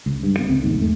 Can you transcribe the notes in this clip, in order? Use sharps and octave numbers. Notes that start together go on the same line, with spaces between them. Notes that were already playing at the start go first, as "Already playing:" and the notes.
C#2
G2
F#1 B3
C#2 C4
F1 A#1 D#2 G#2
E2 E3 A3